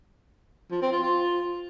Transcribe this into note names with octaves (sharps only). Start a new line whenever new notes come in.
F3
C4
F4
F4